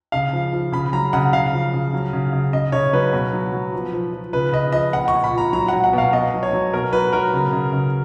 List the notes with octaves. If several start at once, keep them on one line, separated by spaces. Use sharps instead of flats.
C#3 F5
F3
F3
C#3 B5
F#3 A#5
C#3 F#5
C#3 F5
F3
C#3
F#3
C#3
C#3
C#3 D#5
C#3 C#5
F#3 B4
B2
F#3
F#3
F3
F3
F3
C#3 B4
C#3 D#5
F3 D#5
A#2 F#5
C#6
A#2
B5
A#2 A#5
F#3 A#5
F#3 F#5
F#5
B2 F5
B2 D#5
F#3
C#5
F#3
B2 A#4
F#3 B4
F#3 A#4
C#3
C#3
C#3